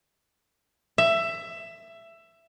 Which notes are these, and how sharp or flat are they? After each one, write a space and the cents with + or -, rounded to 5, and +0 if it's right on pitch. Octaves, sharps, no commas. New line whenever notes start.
E5 +15